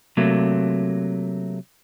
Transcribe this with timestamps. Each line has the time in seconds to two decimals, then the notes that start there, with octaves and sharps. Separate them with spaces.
0.17 C3 F#3 A3 A#3